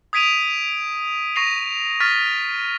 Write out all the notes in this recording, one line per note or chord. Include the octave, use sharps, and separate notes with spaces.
D#6 G#6 B6 D7 D#7 F7
C#6 A#6 C7 F7
C#6 F6 A6 B6